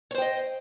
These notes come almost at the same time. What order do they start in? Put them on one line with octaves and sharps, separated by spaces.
C#5 C5 G5 D#5